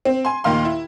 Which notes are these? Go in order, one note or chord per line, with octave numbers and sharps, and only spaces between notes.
C4
G#5 C6
D#2 A#2 D#3 F5 C6
E4